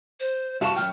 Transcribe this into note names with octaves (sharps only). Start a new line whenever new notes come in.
C5
C2 F#4 E5 F5 A5 C#6
F#2 F#3 G5 F6